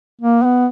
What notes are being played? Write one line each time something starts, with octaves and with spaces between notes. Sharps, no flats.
A#3
B3